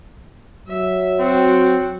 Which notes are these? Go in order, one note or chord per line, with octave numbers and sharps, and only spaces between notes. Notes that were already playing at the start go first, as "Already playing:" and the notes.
F#3 E5
C4 F#4